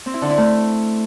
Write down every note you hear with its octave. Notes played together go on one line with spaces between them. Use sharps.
C4
E4
D3
E4
A3